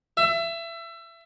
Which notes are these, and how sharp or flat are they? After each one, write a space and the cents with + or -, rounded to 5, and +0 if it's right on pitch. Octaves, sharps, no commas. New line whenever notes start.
E5 +25